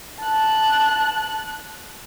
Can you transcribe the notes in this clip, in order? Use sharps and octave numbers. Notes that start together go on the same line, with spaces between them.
A5 F#6